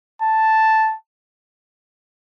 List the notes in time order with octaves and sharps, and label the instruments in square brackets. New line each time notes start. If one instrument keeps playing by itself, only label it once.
[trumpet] A5